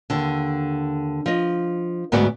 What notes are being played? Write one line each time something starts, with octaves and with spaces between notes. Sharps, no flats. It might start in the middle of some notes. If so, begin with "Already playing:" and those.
D#2 D3
F3 D#5
D2 G#2 B3 F#4 D5 F#5